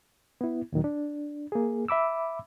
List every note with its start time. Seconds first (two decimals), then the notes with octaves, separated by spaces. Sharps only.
0.41 B3 E4
0.72 D#2 A#2 D#3 F#3
0.84 D4
1.52 A#3 G#4
1.88 E5 B5 D6 E6